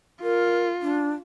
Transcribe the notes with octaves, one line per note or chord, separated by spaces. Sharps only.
F4 A#4
D4